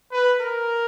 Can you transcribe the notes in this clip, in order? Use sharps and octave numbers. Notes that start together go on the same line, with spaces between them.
B4
A#4